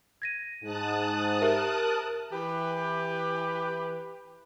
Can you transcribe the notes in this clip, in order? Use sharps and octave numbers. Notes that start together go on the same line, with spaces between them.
G#6 A#6 D#7
G#2 A5 D#6 F#6
G4 A#4 E5
E3 G4 B4